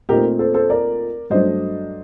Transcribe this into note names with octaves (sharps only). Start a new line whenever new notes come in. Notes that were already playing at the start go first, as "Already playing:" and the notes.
A#2 A3 C4 D#4 G4 A#4
A4 C5
A4 C5
A#4 D5
G2 F#3 A3 D4 C5 D#5